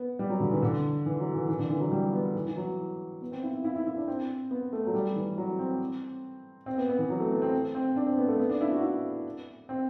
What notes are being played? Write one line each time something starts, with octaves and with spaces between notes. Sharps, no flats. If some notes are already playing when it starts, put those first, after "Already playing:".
Already playing: B3
G3
F#3
D3
E3
D3
E3
F#3
E3
E3
D3
E3
F#3
G3
B3
E3
E3
F#3
B3
C4
E4
E4
E4
E4
E4
D4
C4
B3
A3
F#3
G3
E3
F#3
C4
C4
B3
B3
E3
F#3
A3
B3
C4
C4
D4
C4
B3
A3
B3
D4
E4
F#4
E4
C4